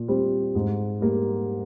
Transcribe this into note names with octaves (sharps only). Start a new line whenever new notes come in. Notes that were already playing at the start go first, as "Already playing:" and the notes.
Already playing: A#2
G3 C4
G#2
G3 A#3